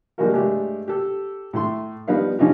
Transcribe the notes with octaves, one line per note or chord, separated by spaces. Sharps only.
F3 G3 G#3 A#3 F#4 A#4
G2 G#3 A3 D4 G4
G4 A4
A2 A3 C6
F3 G3 B3 D#4 F5
F3 C#4 D#4 F4 G4